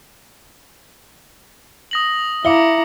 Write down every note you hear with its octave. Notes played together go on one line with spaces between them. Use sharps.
D#6 A#6 F#7
E4 E5 F5 A#5 D6 C#7 G7